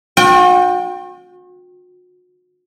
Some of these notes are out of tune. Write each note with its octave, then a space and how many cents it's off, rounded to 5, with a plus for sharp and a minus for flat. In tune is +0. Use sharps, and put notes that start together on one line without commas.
F#4 -40 G5 +0